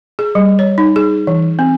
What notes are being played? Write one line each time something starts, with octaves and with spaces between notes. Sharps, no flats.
G#4
G3
C#5
D#4
G#4
E3
C4